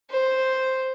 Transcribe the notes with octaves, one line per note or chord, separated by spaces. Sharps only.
C5